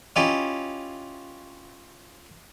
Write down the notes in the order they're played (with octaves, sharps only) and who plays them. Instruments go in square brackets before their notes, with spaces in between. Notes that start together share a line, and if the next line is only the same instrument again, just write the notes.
[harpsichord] C#4 E4 F4 G4 D#5